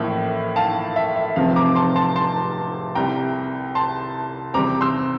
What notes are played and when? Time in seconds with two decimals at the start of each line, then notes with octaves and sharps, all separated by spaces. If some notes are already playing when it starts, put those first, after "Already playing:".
Already playing: A1 A2 F3 A#3 E5
0.56 F5 A5
0.96 E5
1.16 E5
1.36 F1 E2 C3 F3 C4 F5
1.56 A#5 D6
1.75 A5 C6
1.95 A5 C6
2.16 A5 C6
2.95 C2 C3 G3 G5 A#5
3.75 A5 C6
4.54 E2 C3 G3 C4 A#5 D6
4.81 C6 E6